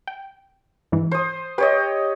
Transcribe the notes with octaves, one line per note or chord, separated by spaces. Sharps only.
G5
G#2 E3
C5 D#6
G4 B4 C#5 D#5